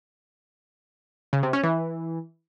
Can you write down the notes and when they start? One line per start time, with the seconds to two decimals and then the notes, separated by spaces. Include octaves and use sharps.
1.33 C#3
1.43 C3
1.53 C#4
1.63 E3